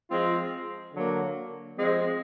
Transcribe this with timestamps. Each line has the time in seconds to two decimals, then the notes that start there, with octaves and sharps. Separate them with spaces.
0.09 F3 G#3 C4 F4
0.94 D3 F#3 A#3
1.77 F3 G#3 C4